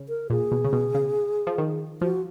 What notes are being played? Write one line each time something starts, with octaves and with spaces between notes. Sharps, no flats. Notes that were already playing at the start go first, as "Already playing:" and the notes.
Already playing: C#3
A#4
A#2 G#4
B2
C#3
B2
C#3
F3
D#3
F3 F#4